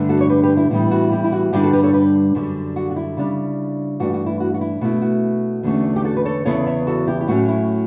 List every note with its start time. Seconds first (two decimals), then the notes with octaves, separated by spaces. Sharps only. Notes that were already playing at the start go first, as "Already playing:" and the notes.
Already playing: G2 D3 A3 D4
0.09 F#4 A4
0.21 C#5
0.30 G4 B4
0.43 G4 B4
0.57 E4 G4
0.70 A2 E3 G3 B3 E4
0.91 F#4
1.12 E4 G4
1.24 E4
1.32 F#4
1.53 G2 D3 G3 D4 E4 G4
1.63 F#4 A4
1.73 G4 B4
1.84 A4 C#5
1.94 G4 B4
2.35 F#2 D3 G3
2.76 F#4
2.91 F#4
2.96 E4
3.17 C#3 G3 D4
4.00 G2 E3 A3 D4 F#4
4.14 F#4
4.26 E4
4.40 F#4
4.54 F#4
4.61 E4
4.81 B2 A3 E4 F#4
5.02 F#4
5.63 E2 D3 A3 C#4
5.96 G4
6.04 F#4 A4
6.17 B4
6.25 A4 C#5
6.45 E2 C#3 E3 B3 E4 A4 C#5
6.67 C#5 E5
6.87 F#4 A4
7.08 E4 G4
7.21 G4
7.28 A2 F#3 A3 C#4 F#4
7.49 E4